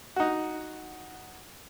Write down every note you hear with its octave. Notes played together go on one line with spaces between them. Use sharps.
D#4 F#4